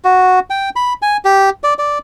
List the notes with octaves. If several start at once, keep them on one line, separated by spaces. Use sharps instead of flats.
F#4
G5
B5
G#5
G4
D5
D5